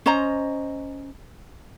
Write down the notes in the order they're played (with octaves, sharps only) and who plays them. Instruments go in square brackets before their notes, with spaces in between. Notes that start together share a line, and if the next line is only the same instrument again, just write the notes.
[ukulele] C#4 C5 D#5 A#5